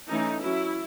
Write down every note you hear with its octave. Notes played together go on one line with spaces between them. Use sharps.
E3 A3 C#4 D#4
F#3 C#4 E4